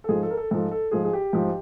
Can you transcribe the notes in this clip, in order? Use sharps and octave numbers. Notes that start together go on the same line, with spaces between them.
A4
G#2 F3 G#4
A4
A#4
A4
G#2 F3 A4
A4
G#2 F3 G#4
G#4
G4
G#2 F3